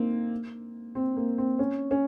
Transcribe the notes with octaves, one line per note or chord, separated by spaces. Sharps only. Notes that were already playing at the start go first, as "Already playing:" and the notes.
Already playing: A#3 C4 D#4
C4
A#3
C4
C#4
C#4